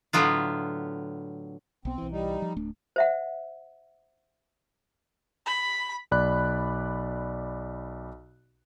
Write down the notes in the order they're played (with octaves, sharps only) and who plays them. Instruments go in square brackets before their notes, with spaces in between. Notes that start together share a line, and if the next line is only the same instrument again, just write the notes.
[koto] A2 D3 F#3 B3 F4
[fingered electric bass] B1 B3 [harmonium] C4
[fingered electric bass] B1 E3
[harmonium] G3 D#4
[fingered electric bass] F3
D1 A3 D4
[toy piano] C5 E5 F#5
[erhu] B5
[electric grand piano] B1 D5 B5 F#6